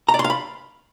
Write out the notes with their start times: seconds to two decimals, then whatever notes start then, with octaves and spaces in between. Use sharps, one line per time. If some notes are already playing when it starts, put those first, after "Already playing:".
0.09 A#5
0.14 D5
0.19 C6
0.24 F5
0.30 B5